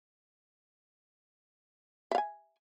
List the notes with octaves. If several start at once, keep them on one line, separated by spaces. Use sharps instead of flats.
E5 F5 G#5